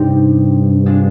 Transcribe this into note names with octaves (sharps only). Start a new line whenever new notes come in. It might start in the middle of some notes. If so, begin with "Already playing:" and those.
Already playing: G2 C3 G3 C4 D#4 G4
G#3 D4 F4